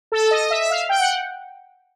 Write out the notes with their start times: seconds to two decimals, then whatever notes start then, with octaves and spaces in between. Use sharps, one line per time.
0.12 A4
0.31 D#5
0.50 E5
0.61 E5
0.70 F5
0.89 G5
1.00 F#5